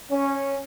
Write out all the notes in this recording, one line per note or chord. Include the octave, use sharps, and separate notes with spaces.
C#4